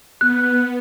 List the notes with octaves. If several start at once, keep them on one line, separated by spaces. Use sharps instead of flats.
B3 F#6